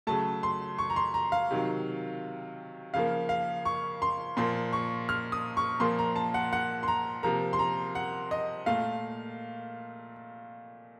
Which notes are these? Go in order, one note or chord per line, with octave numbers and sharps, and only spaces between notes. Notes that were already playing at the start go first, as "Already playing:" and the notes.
C#3 F#3 A3 A5
C6
C#6
A#5
C6
A#5
F5
C3 D#3 F#3
C#3 F3 A#3 F5
F5
C#6
C6
A#2 F3 A#3 C6
C#6
F6
D#6
C#6
A#2 F3 A#3 C6
A#5
A5
F#5
F#5
C6
A#5
C3 F3 A#3 A#5
C6
A#5
F#5
D#5
A#2 A3 F5